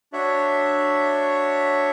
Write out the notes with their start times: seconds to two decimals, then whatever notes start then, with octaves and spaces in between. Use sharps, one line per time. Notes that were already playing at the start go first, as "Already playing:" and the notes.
0.13 D4 F#4 C#5 E5